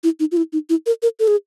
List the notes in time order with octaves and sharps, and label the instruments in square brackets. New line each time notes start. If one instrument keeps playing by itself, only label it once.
[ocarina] E4
D#4
F4
E4
D#4
E4
A#4
A#4
A4
G#4